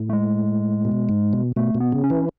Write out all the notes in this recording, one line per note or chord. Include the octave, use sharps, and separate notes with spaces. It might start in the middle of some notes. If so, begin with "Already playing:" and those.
Already playing: A2
A3
G#3
B2
G#2
B2
B2 A3
B2
B3
C#3
C#4
E3